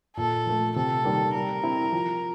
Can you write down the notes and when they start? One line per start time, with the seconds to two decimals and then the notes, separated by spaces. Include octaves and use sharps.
0.17 A#2 A4
0.46 F3 A3
0.76 C3 A4
1.04 D#3 G3 A#3
1.34 G3 A#4
1.63 C4 E4
1.92 F3